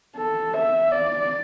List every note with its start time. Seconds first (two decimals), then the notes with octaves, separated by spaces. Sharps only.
0.16 A4
0.54 E5
0.92 D5